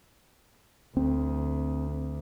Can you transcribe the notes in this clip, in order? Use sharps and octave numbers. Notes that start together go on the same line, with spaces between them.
D2 C4